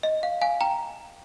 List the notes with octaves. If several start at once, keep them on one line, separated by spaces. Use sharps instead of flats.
D#5
F5
F5 G#5
G5 A#5